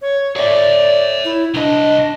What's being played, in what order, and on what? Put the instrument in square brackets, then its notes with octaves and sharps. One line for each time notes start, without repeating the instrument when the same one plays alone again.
[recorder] C#5
[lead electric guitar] C#5 E5 [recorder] D5
[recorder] E4
[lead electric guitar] C2 D#5 [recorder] D4